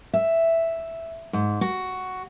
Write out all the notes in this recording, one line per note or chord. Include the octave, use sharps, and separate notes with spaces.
E5
G#2
F#4